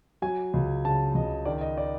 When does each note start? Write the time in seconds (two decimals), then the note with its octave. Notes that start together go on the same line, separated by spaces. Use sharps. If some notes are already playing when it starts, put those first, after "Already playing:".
0.22 F#3 G#5
0.54 C#2
0.85 C#3 A5
1.15 C#2 D#5
1.45 D#3 D5
1.61 D#5
1.77 D5